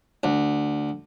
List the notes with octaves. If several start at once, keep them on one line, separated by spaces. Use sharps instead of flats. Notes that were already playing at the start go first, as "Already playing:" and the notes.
D2